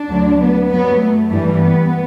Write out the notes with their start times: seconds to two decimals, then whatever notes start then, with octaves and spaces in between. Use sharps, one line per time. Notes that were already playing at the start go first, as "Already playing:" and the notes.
Already playing: D4
0.09 D2 D3 F#3
0.41 B3
0.70 G2 F#3 B3
1.01 A3
1.30 G2 E3 G3
1.61 B3